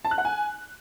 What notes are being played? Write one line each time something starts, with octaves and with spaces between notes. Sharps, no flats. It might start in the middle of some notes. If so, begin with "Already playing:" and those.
A5
F#6
F#5
G#5